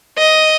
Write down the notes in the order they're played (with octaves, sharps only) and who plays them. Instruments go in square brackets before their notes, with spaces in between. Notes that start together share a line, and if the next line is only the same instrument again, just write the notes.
[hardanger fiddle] D#5